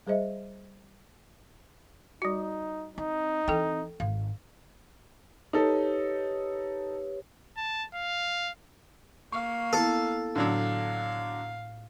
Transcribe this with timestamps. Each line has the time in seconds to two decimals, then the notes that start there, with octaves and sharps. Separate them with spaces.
0.06 G3 G#4 C5 D#5 E5
2.22 G3 D#4 F#4
2.98 C4 D#4
3.48 E3 C4 A4 G5
4.00 G#1 F5
5.53 D#4 G4 A4 B4 C#5
7.57 A5
7.95 F5
9.32 A#3 F5 C#6
9.73 B3 E4 A4
10.36 A2 D3 F#3 D4 D5 F5 E6